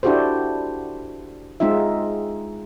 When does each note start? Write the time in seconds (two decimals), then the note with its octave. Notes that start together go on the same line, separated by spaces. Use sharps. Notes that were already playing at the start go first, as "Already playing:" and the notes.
0.03 D4 E4 F#4 G4 A4 C5
1.60 G#3 C4 D#4 F4 E5